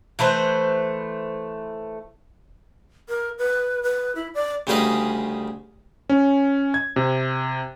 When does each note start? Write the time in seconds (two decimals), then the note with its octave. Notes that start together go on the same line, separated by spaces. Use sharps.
0.19 E3 A3 B4 C5
3.09 A#4
3.39 B4
3.83 B4
4.16 E4
4.34 D5
4.67 D2 C#3 G3 G#4 B4 D#5
6.10 C#4
6.74 G#6
6.96 C3